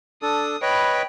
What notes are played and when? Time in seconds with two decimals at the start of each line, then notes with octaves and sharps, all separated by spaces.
0.22 D4 A4 D#6
0.62 B4 C#5 D#5 G5 B5